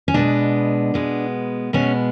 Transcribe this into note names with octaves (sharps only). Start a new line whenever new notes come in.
C#4
B2 G#3 B3 D4
B2 G#3 B3
B2 G#3 B3 C#4